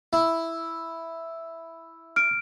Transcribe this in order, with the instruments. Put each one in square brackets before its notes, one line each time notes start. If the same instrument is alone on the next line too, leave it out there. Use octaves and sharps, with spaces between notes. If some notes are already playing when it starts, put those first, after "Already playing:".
[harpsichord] E4
[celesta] F6 D7